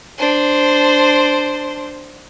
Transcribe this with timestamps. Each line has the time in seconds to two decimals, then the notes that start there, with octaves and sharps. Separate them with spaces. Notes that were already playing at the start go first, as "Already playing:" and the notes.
0.18 D4 C5